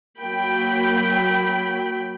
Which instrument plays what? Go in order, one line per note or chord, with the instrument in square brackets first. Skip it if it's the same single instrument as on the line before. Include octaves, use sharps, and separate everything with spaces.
[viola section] F#3 A#3 G5 B5